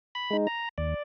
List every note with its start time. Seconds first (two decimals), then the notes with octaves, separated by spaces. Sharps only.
0.15 B5
0.31 G#3 D#4
0.47 A#5
0.78 D#2 D5